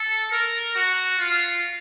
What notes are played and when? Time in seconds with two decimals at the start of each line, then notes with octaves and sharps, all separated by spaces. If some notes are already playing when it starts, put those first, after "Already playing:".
Already playing: A4
0.32 A#4
0.76 F#4
1.19 F4